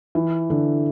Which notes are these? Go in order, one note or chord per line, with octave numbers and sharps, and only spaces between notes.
E3
D3